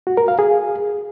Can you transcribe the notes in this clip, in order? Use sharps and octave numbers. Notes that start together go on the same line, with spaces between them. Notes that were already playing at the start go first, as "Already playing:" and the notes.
F#4
A#4
F5
G#4